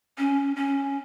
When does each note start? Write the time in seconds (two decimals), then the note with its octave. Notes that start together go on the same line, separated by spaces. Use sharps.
0.18 C#4
0.56 C#4